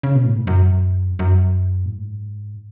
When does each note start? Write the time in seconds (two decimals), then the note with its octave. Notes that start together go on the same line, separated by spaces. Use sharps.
0.03 C#3
0.15 B2
0.25 A2
0.37 G#2
0.47 F#2
1.19 F#2
1.85 A2
1.90 G#2